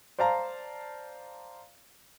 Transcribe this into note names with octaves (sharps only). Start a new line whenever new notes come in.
C5 D5 F5 A5 A#5